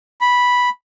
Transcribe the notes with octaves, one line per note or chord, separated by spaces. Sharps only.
B5